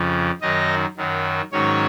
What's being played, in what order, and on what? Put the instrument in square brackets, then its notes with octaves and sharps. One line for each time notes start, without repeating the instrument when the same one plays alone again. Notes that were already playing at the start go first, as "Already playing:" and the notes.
Already playing: [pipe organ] F2 C#3 F3
F#2 D#3 F#3 D#4 D#5
F#2 D#3 F#3
G#2 D#3 F#3 C#4 C#5